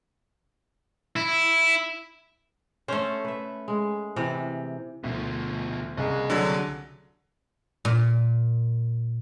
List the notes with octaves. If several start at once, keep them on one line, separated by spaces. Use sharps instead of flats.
E4
A3 C#4 C5
B4 E5
G#3
C3 E3
D2 B2 F3
C2 C#3 A#3 G#4 D#5
D3 F#3
A#2